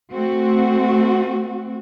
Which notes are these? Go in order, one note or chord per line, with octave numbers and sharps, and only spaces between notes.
A3 C4 F#4